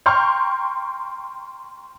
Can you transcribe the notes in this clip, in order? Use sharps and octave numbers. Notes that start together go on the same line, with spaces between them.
G5 A#5 C6 C#6 F6 G6